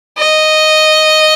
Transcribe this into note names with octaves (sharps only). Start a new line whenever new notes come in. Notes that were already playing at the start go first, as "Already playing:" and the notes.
D#5